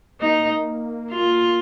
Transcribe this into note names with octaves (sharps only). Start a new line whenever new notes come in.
A#3 D#4
F4